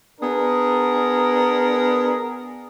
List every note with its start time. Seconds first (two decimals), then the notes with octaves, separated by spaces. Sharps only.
0.21 B3 D4 G#4 A#4